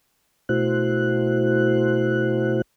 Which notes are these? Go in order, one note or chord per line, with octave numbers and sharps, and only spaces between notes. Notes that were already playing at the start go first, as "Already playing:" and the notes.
B2 A3 E4 F#4 C5 F#6